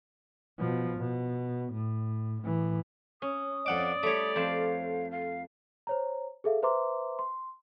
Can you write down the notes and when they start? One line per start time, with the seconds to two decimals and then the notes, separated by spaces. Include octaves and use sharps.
0.59 B2 F3
0.98 B2
1.73 A2
2.42 A2 E3
3.22 C#4 D#6
3.66 F2 D5 F#5 D6
4.03 G3 A3 C#5 D6
4.36 F2 C5 F5 A5
5.11 F5
5.87 C5 C#5 A#5
6.44 G#4 A4 E5 F5
6.62 B4 C5 E5 A#5 C6 D6
7.19 C6